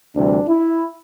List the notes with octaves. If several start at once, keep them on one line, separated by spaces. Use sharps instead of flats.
D2 C3 E3 G3 D4
E4